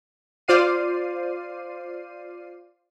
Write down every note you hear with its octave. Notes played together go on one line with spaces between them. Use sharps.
F4 C5 D5 F5 C7 D#7